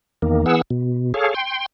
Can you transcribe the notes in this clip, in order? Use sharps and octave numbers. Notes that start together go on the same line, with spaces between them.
E2 D#3 A#3
E3 B3 G#4 F#5 E6
B2
G#4 A4 C#5 F5
G5 C6